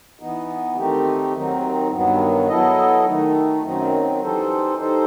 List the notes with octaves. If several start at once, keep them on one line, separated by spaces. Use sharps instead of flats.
E3 B3 D#4
D#3 A3 C4 D#4 G4
D#2 D#3 F#3 C4 D#4
G2 D#3 F#3 B3
F#3 B3 E4 A4 D#5
D#3 A3 D#4
F#2 D#3 F#3 C4 D#4
E3 G3 D#4 A4 C5
G3 D#4 A4 C5